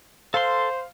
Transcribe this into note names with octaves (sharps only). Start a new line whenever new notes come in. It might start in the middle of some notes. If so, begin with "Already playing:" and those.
A4 C5 F5 C6